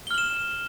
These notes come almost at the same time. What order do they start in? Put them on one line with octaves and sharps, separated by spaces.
G7 F6 F#7 E7